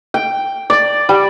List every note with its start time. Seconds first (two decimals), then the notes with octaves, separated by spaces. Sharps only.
0.14 G5
0.70 D5
1.09 G3